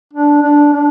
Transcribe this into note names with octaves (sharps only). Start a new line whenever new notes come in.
D4
D4
D4